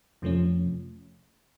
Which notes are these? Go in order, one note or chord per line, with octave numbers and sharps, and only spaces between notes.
F2 C3 F3 A3 C#4